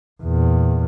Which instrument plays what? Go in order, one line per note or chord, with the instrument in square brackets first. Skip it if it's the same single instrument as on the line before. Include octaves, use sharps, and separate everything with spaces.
[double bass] E2 A#2